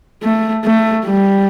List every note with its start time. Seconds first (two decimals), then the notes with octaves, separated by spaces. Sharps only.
0.23 A3
0.65 A3
1.06 G3